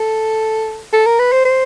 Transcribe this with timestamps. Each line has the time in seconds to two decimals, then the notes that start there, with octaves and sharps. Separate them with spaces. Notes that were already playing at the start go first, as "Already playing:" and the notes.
Already playing: A4
0.93 A4
1.06 A#4
1.19 B4
1.32 C5
1.45 C5